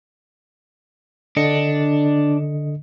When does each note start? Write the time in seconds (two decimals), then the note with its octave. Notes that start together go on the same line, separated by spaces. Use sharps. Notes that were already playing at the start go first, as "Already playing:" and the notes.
1.37 D3 D4 D#5 C#7